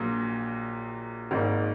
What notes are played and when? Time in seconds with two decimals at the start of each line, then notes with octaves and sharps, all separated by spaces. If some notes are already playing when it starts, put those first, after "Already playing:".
Already playing: A#1 A#2 F#3 A#3
1.31 G#1 G#2 D#3 A#3 D#4